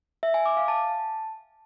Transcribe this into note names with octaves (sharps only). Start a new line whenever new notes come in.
E5
G#5
D6
F5
A5